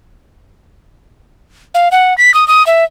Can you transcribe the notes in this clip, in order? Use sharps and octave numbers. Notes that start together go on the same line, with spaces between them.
F5
F#5
B6
D#6
D#6
E5